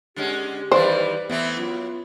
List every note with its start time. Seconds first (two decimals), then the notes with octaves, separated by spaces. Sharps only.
0.16 D3 G#3 C#4 G4
0.72 D#3 E3 G3 B4 C5 D5 F5
1.30 E3 A3 B3 C4 E5
1.57 F#2 F4